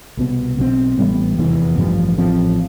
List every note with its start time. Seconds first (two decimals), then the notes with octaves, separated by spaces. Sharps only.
0.17 C2 B2 B3
0.57 B1 B2 G3 C4
0.97 A1 A2 G3 B3
1.37 F1 E2 C3 E3
1.78 A1 G2 F3
2.17 A1 A2 F3 C4